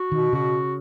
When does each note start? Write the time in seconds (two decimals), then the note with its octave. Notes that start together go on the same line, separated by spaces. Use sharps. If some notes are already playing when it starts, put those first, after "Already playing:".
Already playing: F#4
0.12 B2 D#3
0.33 C#3 F#4